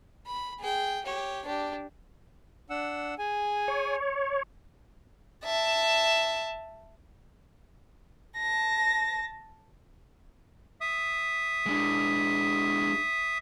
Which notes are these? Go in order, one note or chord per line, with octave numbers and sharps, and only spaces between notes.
B5
G#4 G5
G4 C#5
D4 G4
D4 F#5 E6
G#4 G#5
C#5
E5 A5
A5 A#6
E5 D#6
G#3 D4